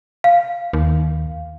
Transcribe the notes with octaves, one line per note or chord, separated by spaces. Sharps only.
F5
D#2